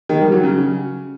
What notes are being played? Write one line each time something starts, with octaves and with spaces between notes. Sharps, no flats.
D#3
G3
F#3
C#3